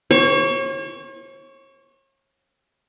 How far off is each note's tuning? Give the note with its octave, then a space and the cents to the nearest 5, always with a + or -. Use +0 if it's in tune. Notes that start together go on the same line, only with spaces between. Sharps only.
C#5 -40 C#6 +25